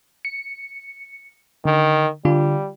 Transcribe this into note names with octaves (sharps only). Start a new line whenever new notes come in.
C#7
D3 D#3
D3 G3 F4